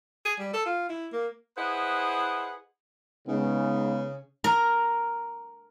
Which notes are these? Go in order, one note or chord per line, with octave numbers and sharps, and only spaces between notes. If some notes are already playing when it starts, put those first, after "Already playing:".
G#4
G3
A4
F4
E4
A#3
E4 G#4 B4 C5 D#5 F#5
C#3 G#3 B3 D#4
A#4